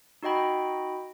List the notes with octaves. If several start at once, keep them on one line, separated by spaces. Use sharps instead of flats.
D#4 F#4 D#5 G5 B5